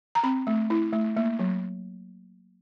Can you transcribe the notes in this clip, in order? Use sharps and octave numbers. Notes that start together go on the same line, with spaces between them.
A#5
C4 B5
A3
E4
A3
A#3
F#3